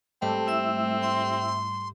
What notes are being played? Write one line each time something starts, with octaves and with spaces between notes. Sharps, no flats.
G#2 G3 A3 C4 A5
E4 E5 E6
C6